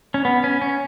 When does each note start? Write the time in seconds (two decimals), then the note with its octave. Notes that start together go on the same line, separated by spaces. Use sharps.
0.14 C#4
0.25 B3
0.44 C#4
0.62 C#4